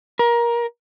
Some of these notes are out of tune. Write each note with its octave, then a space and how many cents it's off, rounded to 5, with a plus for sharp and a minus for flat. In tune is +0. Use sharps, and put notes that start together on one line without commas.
A#4 +20